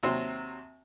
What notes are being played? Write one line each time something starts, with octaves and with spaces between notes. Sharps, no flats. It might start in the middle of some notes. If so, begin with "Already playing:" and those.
D#2 C3 F#3 C4 C6